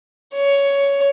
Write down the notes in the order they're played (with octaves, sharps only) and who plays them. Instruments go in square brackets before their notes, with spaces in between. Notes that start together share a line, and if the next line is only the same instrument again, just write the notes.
[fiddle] C#5